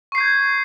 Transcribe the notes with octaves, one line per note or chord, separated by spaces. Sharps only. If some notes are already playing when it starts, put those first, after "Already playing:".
C#6 G6 G#6 C7